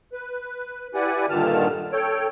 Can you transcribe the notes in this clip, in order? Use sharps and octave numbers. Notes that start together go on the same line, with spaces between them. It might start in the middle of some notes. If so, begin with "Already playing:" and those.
B4
E4 G4 B4 D5 F#5 G#5
G2 A#2 D3 D#3 A5 F6
A4 C#5 G5